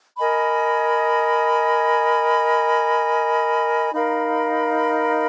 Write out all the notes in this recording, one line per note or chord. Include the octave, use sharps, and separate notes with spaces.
A#4 D#5 G#5 B5
D#4 A#4 F5 B5